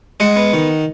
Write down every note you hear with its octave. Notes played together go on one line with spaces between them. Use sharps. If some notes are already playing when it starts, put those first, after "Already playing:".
G#3 D#5 F#5
B3
D#3